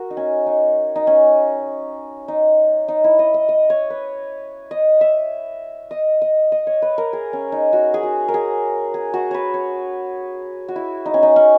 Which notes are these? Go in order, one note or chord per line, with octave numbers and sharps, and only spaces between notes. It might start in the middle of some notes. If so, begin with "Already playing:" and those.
Already playing: F#4 A#4
D#4
C#4
D#4
D#4
C#4
D#4
D#4
E4
D#5
D#5
D#5
C#5
B4
D#5
E5
D#5
D#5
D#5
C#5
B4
A#4
G#4
C#4
D#4
F#4
G#4
F#4
A#4
G#4
G#4
F#4
B4 C#5
C#5
F#4
E4
D#4
C#4
D#4
C#4